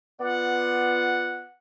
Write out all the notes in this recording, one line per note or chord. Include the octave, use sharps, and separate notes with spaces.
B3 F4 D5 F#5